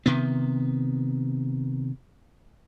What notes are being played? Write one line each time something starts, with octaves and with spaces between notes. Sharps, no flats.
C3 D#3 B3